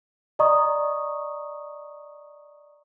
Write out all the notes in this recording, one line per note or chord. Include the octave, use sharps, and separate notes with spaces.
D5 D#5 A#5 C#6 D#6